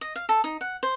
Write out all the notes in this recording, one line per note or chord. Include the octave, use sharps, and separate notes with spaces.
D#5
F5
A4
D#4
F#5
C5